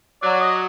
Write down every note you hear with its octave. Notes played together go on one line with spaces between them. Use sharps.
F#3 D5
D#5